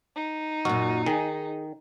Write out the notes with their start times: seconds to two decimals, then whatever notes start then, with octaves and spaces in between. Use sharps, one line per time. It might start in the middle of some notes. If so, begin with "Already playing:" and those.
0.15 D#4
0.65 F#2 A#2 F#4
1.06 D#3 G#4